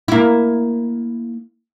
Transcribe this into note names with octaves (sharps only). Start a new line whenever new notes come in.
A#3 E4